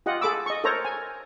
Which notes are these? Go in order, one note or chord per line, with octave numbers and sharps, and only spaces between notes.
F4 G4 D#5 F#5
G#4 A4 B5 D6 E6
D#5 C#6
A4 A#4 C5 C#5 A#5
G#5